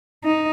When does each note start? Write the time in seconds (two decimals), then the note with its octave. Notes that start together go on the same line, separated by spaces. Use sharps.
0.24 D#4